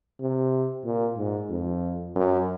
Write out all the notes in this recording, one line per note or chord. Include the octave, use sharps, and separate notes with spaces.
C3
A#2
G#2
F2
F#2